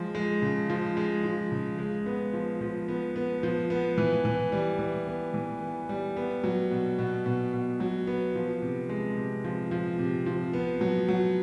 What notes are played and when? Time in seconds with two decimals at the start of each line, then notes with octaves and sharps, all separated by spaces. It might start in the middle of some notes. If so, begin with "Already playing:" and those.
Already playing: F3 G#3
0.15 G#3
0.42 C#3
0.70 F3
0.97 G#3
1.24 F3
1.52 C#3
1.78 G#3
2.06 B3
2.34 F3
2.61 F3
2.88 B3
3.16 B3
3.43 F3
3.70 B3
3.98 E3
4.25 E3
4.52 G3
4.79 E3
5.07 B3
5.34 E3
5.61 B3
5.89 G3
6.17 B3
6.44 F#3
6.71 B2
6.98 B2
7.26 B2
7.53 B2
7.80 F#3
8.07 B3
8.35 F3
8.62 C3
8.89 G#3
9.17 C3
9.44 F3
9.71 F3
9.99 C3
10.26 F3
10.53 B3
10.81 F#3
11.09 F#3